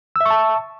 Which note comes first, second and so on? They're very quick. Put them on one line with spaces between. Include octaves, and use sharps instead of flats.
E6 E5 C#6 A5